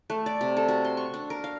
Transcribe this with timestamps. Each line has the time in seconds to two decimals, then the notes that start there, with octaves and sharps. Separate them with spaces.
0.10 A3
0.26 D5
0.41 C3
0.57 A4
0.68 F#4
0.85 C6
0.97 C#6
1.14 D4
1.30 A#4
1.44 F5